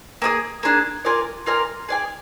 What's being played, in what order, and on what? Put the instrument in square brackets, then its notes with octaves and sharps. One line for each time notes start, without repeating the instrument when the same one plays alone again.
[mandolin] A#3 D4 G#4
A#3 D4 G#4
F4 A#4 D5 G#5
F4 A#4 D5 G#5
G#4 D5 G#5